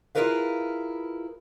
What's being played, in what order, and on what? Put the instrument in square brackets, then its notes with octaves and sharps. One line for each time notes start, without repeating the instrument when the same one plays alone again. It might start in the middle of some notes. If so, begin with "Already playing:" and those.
[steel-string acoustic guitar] E4 F4 G#4 A#4 B4 F5